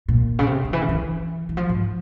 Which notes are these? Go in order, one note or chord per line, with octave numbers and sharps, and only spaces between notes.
A#2
C#3
C3
C#3
E3
C#3
E3
E3
F3
G#2